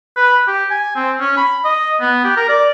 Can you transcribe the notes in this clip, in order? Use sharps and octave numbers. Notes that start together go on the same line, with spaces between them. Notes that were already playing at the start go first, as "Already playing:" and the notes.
B4
G4
G#5
C4
C#4
B5
D#5
B3
G4
A#4
D5